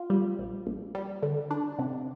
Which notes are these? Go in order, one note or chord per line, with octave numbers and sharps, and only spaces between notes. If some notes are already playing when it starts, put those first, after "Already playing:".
Already playing: F4
G3
A#1
A#1
G3
D3
D4
C3